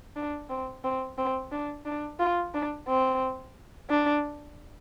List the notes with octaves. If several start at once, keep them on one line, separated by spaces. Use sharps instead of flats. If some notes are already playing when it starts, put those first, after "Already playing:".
D4
C4
C4
C4
D4
D4
F4
D4
C4
D4